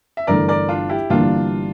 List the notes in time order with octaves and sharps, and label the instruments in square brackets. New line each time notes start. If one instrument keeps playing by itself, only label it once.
[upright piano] E5
[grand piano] G1 G2 E3 A3 [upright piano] A#4 D5
[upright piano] A#4 D5
D4 F4
E4 G4
[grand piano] G1 G2 E3 G3 A#3 [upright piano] D4 F4